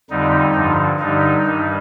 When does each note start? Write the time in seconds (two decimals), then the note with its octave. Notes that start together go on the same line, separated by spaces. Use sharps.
0.10 F2 D3 G3 D#4
0.55 G2 D3 F3
1.00 G2 D3 G3 D#4
1.44 G2 D#3 G3